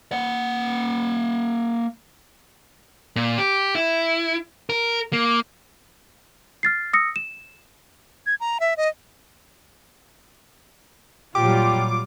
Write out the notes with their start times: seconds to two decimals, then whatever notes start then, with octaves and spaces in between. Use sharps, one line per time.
0.12 A#3 F#5
3.16 A#2
3.38 G4
3.75 E4
4.69 A#4
5.13 A#3
6.63 F6 A6 C7
6.93 D#6 E6 A#6 C#7
7.16 E7
8.26 G#6
8.40 A#5
8.60 E5
8.77 D#5
11.35 A#2 F#3 G3 F4 G4 D6